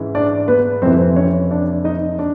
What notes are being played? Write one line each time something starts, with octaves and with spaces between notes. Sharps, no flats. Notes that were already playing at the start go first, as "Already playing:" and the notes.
Already playing: G#2 E3 G#3 C#4
D4 D5
B3 B4
F2 C3 E3 C4 C5
C#4 C#5
D4 D5
D#4 D#5
D4 D5